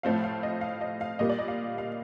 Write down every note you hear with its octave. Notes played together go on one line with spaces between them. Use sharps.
A2 F3 A3 C4 F5
F5
D#5
F5
D#5
F5
A#2 G3 A#3 D#5
D5
D#5
F5
F5